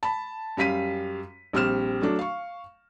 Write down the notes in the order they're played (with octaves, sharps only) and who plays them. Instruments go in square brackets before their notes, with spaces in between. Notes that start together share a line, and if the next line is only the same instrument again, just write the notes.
[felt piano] A5 B5
F#2 G3 F5 B6 D#7
A#1 G3 C4 F6 E7
F#3 A3 D4
F5 C#6